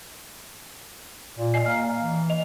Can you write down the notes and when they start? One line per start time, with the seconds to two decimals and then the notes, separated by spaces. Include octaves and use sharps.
1.38 A#2
1.54 D#5 G#5 C7
1.66 A#3 F6
2.02 E3
2.30 D#5 F7